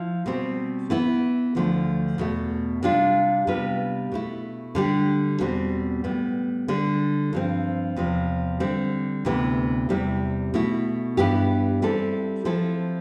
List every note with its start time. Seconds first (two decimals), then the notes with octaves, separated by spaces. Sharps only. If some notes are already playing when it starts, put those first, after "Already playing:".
Already playing: F3 E4
0.26 B2 G3 C4
0.90 E3 B3 E4
1.55 D2 D3 F3 A3
2.18 E2 B2 A3
2.83 C3 G3 D4 F4
3.47 C3 G3 B3 F4 B4
4.12 B2 A3 E4
4.75 D3 G3 D4 G4
5.40 E2 B2 G3 C4
6.04 A2 G3 B3
6.68 D3 G3 D4
7.33 G2 F3 C4
7.96 E2 C3 F3
8.60 D3 G3 C4
9.25 D2 C3 E3 B3
9.89 E2 C3 G3 C4 E4
10.54 B2 A3 E4
11.17 G2 E3 B3 E4 G4
11.82 E3 G3 C4 E4 A4
12.45 F3 C4 E4 A4